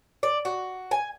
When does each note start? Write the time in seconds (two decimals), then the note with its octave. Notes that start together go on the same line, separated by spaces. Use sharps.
0.23 D5
0.45 F#4
0.91 G#5